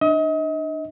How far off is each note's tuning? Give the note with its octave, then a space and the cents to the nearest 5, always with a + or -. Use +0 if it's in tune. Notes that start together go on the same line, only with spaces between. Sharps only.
D4 +30 D#5 +35